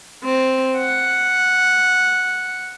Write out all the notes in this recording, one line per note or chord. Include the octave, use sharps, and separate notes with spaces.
C4
F#5